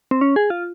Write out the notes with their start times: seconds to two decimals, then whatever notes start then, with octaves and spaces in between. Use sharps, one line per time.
0.11 C4
0.21 C#4
0.36 G#4
0.50 F4